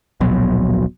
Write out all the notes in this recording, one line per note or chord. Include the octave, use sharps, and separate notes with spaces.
D1 A#1 B2 F#3